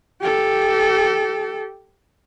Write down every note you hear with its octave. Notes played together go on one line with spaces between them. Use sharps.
G4 A4